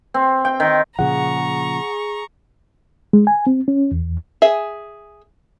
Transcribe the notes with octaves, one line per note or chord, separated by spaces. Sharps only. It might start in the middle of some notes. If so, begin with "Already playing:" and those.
C4
G5
D#3
A#2 C#3 F3 G#4 F#5 A#5 C#6
G#3
G#5
C4
C#4
E2
G#4 E5